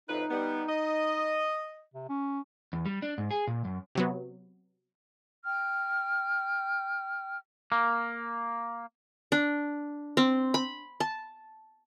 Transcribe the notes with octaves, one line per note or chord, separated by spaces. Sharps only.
F2 A2 D#4 B4
G3 B3
D#5
C3
C#4
E2
G3
D4
G#2
G#4
A#2
F#2
C3 F#3 B3
G5 F6
A#3
D4
C4
B5
A5